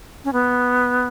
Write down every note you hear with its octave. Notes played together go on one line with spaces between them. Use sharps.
C#4
B3